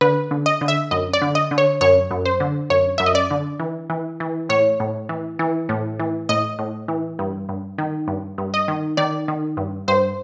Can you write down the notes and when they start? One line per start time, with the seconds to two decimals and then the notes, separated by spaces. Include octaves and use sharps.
0.01 D3 B4
0.31 D3
0.46 D#5
0.61 D3
0.68 E5
0.91 F#2 D#5
1.13 D5
1.21 D3
1.35 D#5
1.51 D3
1.58 C#5
1.81 F#2 C#5
2.11 F#2
2.26 C5
2.40 D3
2.70 F#2 C#5
2.98 F#2 E5
3.06 D#5
3.15 D5
3.31 D3
3.60 E3
3.90 E3
4.20 E3
4.49 A2 C#5
4.80 A2
5.09 E3
5.39 E3
5.69 A2
6.00 E3
6.29 A2 D#5
6.59 A2
6.88 E3
7.19 G2
7.49 G2
7.78 D#3
8.08 G2
8.38 G2
8.54 D#5
8.68 D#3
8.97 D#3 D5
9.28 D#3
9.57 G2
9.88 G2 C5